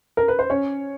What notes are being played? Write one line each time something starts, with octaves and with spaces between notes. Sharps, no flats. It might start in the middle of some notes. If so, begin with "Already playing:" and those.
A#4
B4
C5
C#4 C#5